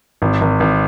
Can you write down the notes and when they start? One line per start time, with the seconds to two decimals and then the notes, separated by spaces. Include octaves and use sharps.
0.22 G#1
0.41 G#1
0.60 G#1